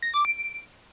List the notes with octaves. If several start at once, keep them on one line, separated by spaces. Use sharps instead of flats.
A#6
D6
D7